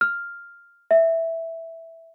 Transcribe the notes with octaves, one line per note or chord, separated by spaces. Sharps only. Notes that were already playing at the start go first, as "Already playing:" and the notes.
F6
E5